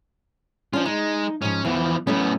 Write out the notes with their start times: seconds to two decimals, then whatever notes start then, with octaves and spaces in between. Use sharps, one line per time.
0.73 F3 C#4 D4 F4
0.85 G#3 D#4
1.42 G#2 F3 C#4
1.65 E2 E3 F3
2.07 A2 F#3 A3 B3 C#4